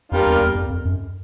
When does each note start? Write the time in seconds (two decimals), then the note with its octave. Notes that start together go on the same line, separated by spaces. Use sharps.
0.12 F2 G3 A#3 D4 F4 A#4
0.27 E2
0.41 E2
0.55 F2
0.70 F2
0.85 F#2